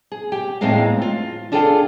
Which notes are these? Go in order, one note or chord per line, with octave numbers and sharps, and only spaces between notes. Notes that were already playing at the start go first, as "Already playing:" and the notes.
G#4
G4 G5
E2 A2 G#3 C4 D#4 F5
F4
D4 F4 G#4 A4 G5